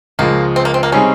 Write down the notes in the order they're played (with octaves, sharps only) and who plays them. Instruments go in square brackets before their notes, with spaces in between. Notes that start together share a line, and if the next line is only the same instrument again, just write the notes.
[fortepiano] C#2 C#3 F3 G#3 [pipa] A#3
[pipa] C4
A#3
C4
A#3
[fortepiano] C3 G3 C4 D#4 G#4 [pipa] C#4